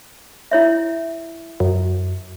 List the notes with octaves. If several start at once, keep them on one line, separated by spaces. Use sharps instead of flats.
E4 C#5 E5
F#2